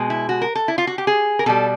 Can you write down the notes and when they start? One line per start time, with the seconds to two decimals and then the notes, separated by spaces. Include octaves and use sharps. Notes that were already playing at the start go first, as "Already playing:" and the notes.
Already playing: B2 G#3
0.10 E4
0.29 F#4
0.42 A#4
0.55 A4
0.68 E4
0.78 F4
0.87 F#4
0.98 G4
1.07 G#4
1.39 A#4
1.46 B2 G3 A4